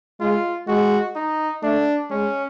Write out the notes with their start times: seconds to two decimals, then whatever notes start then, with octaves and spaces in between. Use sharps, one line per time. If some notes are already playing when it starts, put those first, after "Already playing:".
0.20 G#3 F4
0.68 G#3 F#4
1.15 D#4
1.62 A3 D4
2.10 G#3 C#4